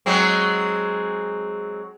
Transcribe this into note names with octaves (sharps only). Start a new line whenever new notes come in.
F#3 G#3 C4